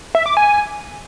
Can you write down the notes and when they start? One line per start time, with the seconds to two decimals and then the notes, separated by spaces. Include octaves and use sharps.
0.15 E5
0.26 D6
0.37 G#5